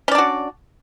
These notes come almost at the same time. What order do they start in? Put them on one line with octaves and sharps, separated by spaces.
C#4 D5 D4 F#4